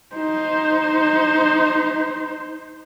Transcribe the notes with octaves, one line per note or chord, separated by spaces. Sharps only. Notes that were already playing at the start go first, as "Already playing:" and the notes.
D#4 C5